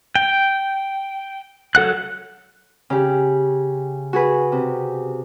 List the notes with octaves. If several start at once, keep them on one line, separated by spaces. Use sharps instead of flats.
G5
F#3 A4 F#5 F#6
C#3 G4
F#4 G#4 B4
C3